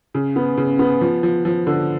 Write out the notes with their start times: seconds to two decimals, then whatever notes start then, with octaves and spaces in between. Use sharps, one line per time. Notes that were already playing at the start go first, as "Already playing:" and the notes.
0.14 C#3
0.36 B3
0.57 C#3
0.79 B3
1.01 F3
1.23 F3
1.45 F3
1.67 D3